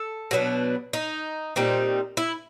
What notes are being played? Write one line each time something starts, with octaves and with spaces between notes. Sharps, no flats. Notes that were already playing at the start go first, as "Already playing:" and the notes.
Already playing: A4
B2 F#3 B3 D4
D#4
A#2 G3 C4 D#4
E4